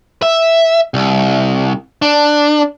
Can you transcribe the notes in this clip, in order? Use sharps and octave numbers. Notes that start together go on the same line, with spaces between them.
E5
C2
D4